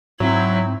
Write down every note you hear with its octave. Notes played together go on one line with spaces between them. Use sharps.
G#2 F#3 C4 E4